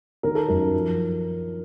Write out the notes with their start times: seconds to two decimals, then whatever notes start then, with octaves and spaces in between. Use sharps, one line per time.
0.23 D#3 A#4
0.35 A4
0.48 F#2 A#4
0.74 F3